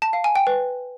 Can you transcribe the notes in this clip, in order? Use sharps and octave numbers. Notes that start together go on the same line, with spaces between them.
A5
F5
G#5
G5
B4